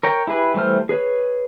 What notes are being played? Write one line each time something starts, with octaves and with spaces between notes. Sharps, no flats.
A#4 C#5 G5
E4 G4 G#4 B4
E3 G3 A3 C5 F6
G#4 B4 C#5